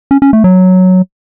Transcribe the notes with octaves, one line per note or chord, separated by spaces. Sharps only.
C#4
C#4
A3
F#3